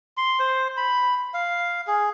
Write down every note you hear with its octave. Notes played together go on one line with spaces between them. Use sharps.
C6
C5
B5
F5
G#4